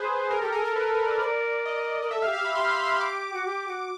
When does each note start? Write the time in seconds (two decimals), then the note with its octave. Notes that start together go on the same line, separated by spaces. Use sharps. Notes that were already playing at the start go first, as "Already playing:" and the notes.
Already playing: G#4 B4 C5
0.31 G#4 A#4
0.41 G4 A4
0.52 G#4 A#4
0.65 A4
0.76 B4
1.06 D5
1.21 C5 D5
1.24 A#4
1.66 D#5
2.02 A#4
2.11 A4 E5
2.22 F5
2.26 G4
2.33 F5
2.40 G4 B5
2.55 G4 C6
2.70 B5
2.85 C6
3.00 D6
3.33 F#4
3.46 G4
3.68 F#4